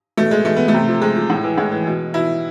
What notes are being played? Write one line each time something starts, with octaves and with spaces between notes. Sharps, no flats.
B2 A3
G#3
B2 A3
B3
A3
C3
F3
C3 G#3
F3
A2
E3
A2 G#3
E3
B2
B2 E4